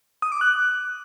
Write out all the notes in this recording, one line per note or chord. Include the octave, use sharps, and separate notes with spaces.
D#6
D6
F#6